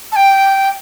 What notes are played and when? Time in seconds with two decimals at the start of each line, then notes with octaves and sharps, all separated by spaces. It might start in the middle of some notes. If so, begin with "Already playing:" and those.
0.12 A5
0.16 G5